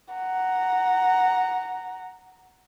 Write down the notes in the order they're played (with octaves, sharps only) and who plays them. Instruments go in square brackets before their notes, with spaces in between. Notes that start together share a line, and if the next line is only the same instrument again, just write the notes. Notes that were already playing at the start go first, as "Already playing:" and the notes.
[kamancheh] F#5 A#5